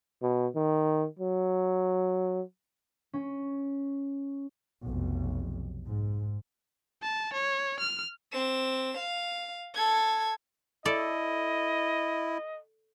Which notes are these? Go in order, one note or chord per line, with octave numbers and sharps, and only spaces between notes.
B2
D#3
F#3
C#4
F1 B1
G#2
A5
C#5
F6
C4 E7
F5
A4 G#6
E4 A4 D5 D#5